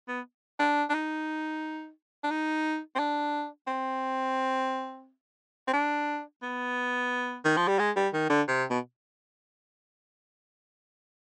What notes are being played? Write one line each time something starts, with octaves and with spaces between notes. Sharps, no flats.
B3
D4
D4
D#4
D4
D#4
C4
D4
C4
C4
D4
B3
D#3
F3
G3
G#3
G3
D#3
D3
C3
B2